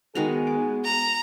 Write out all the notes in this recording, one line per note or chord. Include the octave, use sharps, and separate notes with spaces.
D#3 G#3 B3 F#4 G#4 A#5
D6
A#5